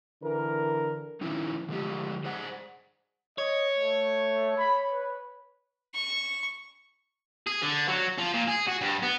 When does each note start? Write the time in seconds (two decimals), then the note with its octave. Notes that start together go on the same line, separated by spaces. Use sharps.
0.22 D3 E3 A#4
1.21 D#3 F3 C#4 D#4 E4
1.69 D3 F3 G#3 G4
2.25 G#4 C5 D5 F#5
3.38 C#5 D#5
3.78 A3
4.57 B5
4.92 B4
5.94 C#6
7.47 G#4
7.62 D3
7.88 F#3
8.18 F3
8.34 A#2
8.48 G#4
8.67 F#4
8.81 G2
9.03 B3